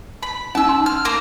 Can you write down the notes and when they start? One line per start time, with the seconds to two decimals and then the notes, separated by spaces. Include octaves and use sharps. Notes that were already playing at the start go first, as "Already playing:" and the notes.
0.23 B5
0.55 C#4 D#4 A5 E6
0.69 C6
0.86 F6
1.05 A#3 C5 A#5